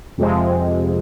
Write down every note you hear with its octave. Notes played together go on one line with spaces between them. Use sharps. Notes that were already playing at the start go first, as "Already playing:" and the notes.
F2 C3 F3 G#3 C4